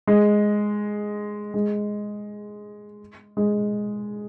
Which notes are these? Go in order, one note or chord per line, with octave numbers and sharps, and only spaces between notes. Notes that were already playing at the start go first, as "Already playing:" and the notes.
G#3
G#3
G#3